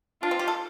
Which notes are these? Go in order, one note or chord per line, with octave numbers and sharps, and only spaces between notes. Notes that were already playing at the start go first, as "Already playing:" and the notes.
D4 F4
C4
G4
A4